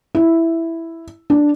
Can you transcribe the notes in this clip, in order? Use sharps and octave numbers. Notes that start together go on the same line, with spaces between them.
E4
D4